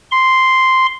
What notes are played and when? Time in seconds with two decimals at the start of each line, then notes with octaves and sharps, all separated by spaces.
0.11 C6